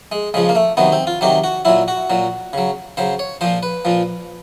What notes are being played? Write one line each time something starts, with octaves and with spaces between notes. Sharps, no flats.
G#3
C#3 F3 G#3
A#3
A3
C3 D#3 F#3 B3
C4
F4
C3 D#3 F#3 G4
F#4
A#2 F#3 E4
F#4
A#2 F#3
C#3 F#3
C#3 F#3 C5
C#5
A#2 F3 C5
B4
A#2 F3